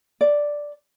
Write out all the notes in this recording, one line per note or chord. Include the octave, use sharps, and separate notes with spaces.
D5